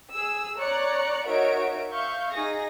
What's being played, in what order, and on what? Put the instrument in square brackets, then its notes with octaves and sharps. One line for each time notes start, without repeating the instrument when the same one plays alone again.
[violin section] G#4 E6
C#5 D5 A#5 F#6 C#7
D#4 F#4 A#4 C#5 E5 D7
E5 F5 C#6 G6
D#4 G#4 A#6